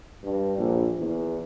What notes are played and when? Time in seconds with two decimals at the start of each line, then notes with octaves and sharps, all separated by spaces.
0.23 G2
0.58 A#1
0.98 E2